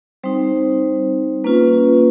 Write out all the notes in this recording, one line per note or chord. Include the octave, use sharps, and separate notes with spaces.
G3 C4 D#4 C5
A#3 C#4 F4 B4